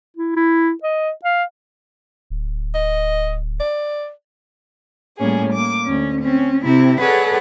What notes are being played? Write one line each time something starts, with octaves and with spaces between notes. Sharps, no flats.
E4
E4
D#5
F5
D1
D#5
D5
A2 G3 A#3 C#4 G#4
A#3 D6
D2 C#4
C4 C#4
C3 C4 E4
G#4 A4 B4 C#5 D5 F#5